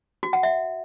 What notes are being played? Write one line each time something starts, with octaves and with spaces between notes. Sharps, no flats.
F#4
F#5
E5